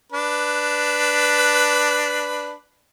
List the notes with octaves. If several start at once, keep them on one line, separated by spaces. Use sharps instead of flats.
D4 B4